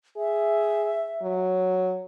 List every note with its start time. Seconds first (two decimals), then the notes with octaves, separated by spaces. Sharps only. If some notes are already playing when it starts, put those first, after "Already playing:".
0.17 G#4 E5
1.22 F#3